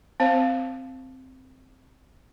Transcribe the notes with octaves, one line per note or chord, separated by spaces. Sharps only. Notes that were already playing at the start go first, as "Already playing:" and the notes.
C4 C5 F5